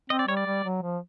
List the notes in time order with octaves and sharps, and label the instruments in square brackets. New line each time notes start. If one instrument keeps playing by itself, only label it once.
[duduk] C4 [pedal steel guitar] D#5
[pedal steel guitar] D5
[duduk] G3 [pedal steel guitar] C#5
[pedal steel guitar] D5
[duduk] G3
F#3
F3